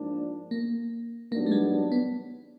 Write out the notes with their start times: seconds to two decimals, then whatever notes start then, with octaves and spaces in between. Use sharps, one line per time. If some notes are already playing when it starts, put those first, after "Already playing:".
Already playing: G#2 F3 A#3 D4
0.51 A#3
1.31 G2 D#3 F#3 A#3 B3 D4
1.46 A3
1.52 G#3
1.92 B3